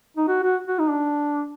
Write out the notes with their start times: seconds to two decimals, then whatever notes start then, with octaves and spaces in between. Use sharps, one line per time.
0.17 D#4
0.28 F#4
0.43 F#4
0.68 F#4
0.79 D#4
0.89 D4